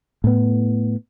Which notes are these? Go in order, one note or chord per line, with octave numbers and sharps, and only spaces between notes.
A2 B3